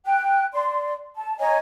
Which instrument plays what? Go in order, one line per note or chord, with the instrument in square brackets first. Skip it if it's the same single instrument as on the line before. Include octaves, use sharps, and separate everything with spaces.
[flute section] G5 F#6
D5 C6
A5
C#5 D#5 G#5 A#5